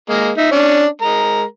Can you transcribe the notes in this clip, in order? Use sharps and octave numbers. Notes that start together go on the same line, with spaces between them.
G#3 A#3
D#4 E5
C#4 D4
G#3 A#4 A#5